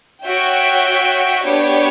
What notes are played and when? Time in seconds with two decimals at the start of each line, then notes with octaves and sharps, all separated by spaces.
0.24 F#4 C#5 E5 G5
1.44 B3 D4 G4 C#5